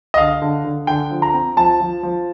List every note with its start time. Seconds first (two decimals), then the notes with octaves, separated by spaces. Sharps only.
0.14 D#5
0.18 D3 F5
0.42 D3
0.64 D3
0.87 D3 G5
1.11 F3
1.22 A#5
1.34 C4
1.57 F3 A5
1.81 F3
2.03 F3